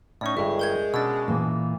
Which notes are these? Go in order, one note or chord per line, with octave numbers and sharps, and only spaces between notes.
A2 C#4 D#4 D5 C#6
G1 G2 G#3 E5
A#4 G6 G#6
B2 C#4 D4 E6 A6
A#2 E3